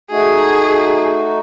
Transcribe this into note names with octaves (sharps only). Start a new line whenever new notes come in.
A3 D#4 F#4 G#4